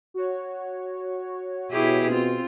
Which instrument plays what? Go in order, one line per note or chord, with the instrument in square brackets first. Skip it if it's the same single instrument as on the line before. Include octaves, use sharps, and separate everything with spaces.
[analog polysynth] F#4 C#5
[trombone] B2 [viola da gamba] E4 G4 G#4
[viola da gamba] C4 F4